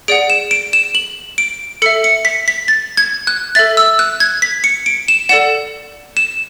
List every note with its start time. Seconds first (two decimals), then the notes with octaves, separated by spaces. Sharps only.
0.08 G#4 D5 F#5 D7
0.30 E7
0.51 D7
0.73 E7
0.95 F#7
1.38 D7
1.82 A4 C#7
1.86 E5
2.04 C#7
2.25 B6
2.48 B6
2.68 A6
2.97 G#6
3.27 F#6
3.55 A4 E5 A6
3.77 E6
3.99 F#6
4.20 G#6
4.42 B6
4.64 C#7
4.86 D7
5.08 E7
5.29 A4 D5 F#5 E7
6.17 E7